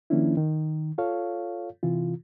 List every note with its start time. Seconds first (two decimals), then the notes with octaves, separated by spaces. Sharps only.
0.10 D#3 F3 A#3 C#4 D4 E4
0.37 D#3
0.98 F4 A4 C#5 F5
1.83 C3 E3 F4